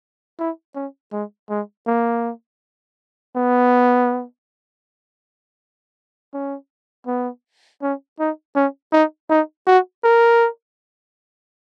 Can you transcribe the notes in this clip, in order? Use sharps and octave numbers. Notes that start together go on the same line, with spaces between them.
E4
C#4
G#3
G#3
A#3
B3
C#4
B3
C#4
D#4
C#4
D#4
D#4
F#4
A#4